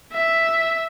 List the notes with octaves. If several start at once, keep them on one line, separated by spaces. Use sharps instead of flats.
E5